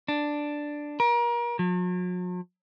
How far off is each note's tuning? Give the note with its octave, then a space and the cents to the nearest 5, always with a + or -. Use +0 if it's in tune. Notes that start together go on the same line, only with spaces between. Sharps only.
D4 +5
A#4 +35
F#3 -45